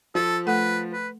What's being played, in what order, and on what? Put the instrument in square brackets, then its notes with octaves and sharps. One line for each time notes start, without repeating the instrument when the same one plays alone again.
[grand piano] F3 [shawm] A4
[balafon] A3 A4 F#5 [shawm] B4
[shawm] B4